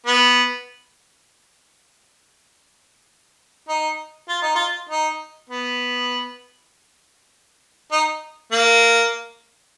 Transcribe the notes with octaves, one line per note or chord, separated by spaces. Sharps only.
B3
D#4
F4
D#4
F4
D#4
B3
D#4
A#3